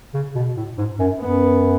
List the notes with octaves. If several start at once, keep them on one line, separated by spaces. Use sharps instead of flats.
C#3
B2
A2
G#2
F#2
F#2 B3